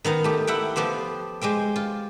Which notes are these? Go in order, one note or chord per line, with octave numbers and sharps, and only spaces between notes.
D#3 B3 D#4 A#5
A3 G4
E4 E5 F#5 G5
F3 B3 G4 C5
G#3 G4 C5 G5
F4